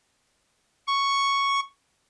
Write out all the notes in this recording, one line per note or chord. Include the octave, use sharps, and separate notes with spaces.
C#6